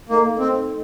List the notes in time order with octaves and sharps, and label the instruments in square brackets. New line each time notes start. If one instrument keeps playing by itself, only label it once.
[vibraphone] A3 D#4 A4 D#5 [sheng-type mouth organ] A#3
[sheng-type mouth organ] C4